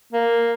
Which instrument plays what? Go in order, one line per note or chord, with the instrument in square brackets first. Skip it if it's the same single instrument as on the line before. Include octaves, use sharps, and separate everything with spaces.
[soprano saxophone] A#3